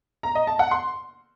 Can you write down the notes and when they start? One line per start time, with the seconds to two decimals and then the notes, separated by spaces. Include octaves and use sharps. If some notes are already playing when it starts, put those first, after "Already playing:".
0.23 A#5
0.35 D#5
0.47 A5
0.59 F#5
0.71 C6